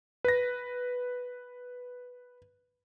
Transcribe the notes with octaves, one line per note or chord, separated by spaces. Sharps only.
B4 A#6